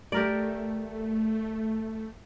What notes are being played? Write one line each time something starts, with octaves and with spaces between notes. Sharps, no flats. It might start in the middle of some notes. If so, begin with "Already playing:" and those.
A3 G4 A#4 D5